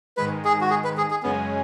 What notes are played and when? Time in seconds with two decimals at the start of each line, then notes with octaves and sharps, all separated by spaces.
0.17 G#2 D#3 G#3 B4
0.45 G#4
0.61 F#4
0.70 G#4
0.84 B4
0.97 G#4
1.10 G#4
1.23 F#2 C#3 G#3 B3 C#4 G#4